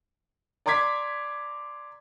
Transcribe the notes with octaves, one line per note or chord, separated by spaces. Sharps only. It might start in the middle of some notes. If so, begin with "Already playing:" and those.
D5 A#5 C6 D6 G#6 B6